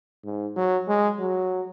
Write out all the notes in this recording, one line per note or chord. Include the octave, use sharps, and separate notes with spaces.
G#2
F#3
G#3
F#3